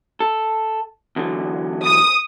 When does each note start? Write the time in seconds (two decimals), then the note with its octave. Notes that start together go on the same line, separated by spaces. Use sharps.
0.20 A4
1.16 E2 D3 F#3
1.85 D#6